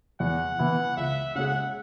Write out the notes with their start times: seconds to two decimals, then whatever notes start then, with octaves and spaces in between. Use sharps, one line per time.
0.20 E2 F#5
0.59 E3 B3 E4
0.97 C#2 E5
1.35 C#3 G#3 C#4 G#4 F#5